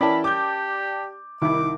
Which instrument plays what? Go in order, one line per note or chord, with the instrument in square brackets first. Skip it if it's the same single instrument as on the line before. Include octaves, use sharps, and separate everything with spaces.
[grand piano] E3 E4 [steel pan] C#4 A#4 [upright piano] D5 G5 A5 [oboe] B5
[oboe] G4 [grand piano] D6 G6
[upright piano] C2 [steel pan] D#3 D#4 E4 [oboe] D6